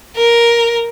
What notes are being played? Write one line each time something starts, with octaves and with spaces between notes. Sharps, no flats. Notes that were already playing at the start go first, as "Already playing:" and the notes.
A#4